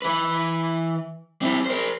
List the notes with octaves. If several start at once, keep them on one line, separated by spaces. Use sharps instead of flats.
E3 B4
C4 E4
A#4 C5